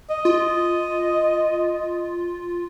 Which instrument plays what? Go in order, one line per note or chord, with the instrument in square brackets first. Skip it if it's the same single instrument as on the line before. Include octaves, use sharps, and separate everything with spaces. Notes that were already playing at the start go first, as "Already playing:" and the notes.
[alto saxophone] D#5
[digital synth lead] F4